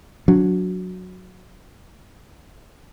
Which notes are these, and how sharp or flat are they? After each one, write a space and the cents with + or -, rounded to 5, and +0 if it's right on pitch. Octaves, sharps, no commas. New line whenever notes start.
F#3 -10 D4 -25